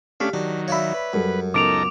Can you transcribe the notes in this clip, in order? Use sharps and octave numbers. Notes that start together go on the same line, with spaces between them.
A3 C#4 D4 G4 F5 B6
D#3 F#3 D4
C#5 D5 E5 F5 B5
B4
F#2 G3 A4
C#2 B3 D#4 A4 A#4 D6 D7 F7